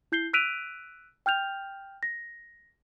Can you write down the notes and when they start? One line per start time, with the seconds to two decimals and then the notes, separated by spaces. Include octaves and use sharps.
0.12 E4 G6 C7 G7
0.33 E6 F#6 B6 D7 D#7 F7
1.26 G5 F6 G6 F7
2.03 A#6